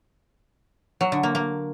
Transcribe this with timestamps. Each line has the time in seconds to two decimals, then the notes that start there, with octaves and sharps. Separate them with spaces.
1.01 F#3
1.12 D3
1.23 A#3
1.35 A#3